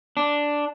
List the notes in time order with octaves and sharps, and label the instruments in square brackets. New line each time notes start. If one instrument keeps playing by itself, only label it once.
[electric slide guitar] D4